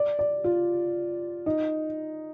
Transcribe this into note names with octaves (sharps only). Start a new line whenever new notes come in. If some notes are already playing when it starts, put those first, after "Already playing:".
Already playing: D5
D5
F4
D#4